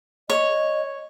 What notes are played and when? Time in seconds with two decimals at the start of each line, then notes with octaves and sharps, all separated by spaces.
0.30 C#5 D#5